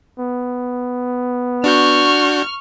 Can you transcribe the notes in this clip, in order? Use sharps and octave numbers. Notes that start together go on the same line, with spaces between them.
B3
D4 F#4 C#6 F6 G6